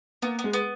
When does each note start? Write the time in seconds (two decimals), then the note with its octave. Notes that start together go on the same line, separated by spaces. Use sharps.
0.22 A#3 B3
0.39 B3
0.44 G#3
0.53 B3